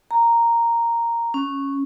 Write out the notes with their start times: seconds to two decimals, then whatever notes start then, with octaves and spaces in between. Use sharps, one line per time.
0.11 A#5
1.34 C#4